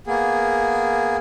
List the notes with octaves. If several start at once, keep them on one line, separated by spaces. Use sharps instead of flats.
A#3 B3 G#4